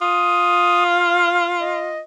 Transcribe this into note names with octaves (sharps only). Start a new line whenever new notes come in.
F4 D#6
F5
D#5